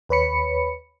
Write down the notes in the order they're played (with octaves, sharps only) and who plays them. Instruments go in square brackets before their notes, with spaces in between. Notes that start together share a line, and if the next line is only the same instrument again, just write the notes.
[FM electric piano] D#2 B4 C#5 B5 C#7